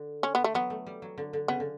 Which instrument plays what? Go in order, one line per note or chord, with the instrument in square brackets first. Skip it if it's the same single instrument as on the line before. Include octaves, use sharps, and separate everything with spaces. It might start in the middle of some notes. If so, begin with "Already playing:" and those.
Already playing: [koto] D3
[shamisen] C#4
B3
A3
[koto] F#3 [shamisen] B3
[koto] A3
G3
F#3
D3
D3
[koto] C#3 [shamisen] B3
[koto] D3